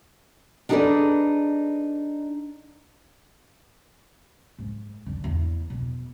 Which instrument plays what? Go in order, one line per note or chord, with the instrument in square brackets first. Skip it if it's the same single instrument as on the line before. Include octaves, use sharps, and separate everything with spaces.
[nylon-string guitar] D4 D#4 G#4 A4 B4 D5
[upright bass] G#2
D3
E2
B2